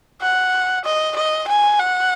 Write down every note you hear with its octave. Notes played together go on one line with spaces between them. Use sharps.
F#5
D#5
D#5
G#5
F#5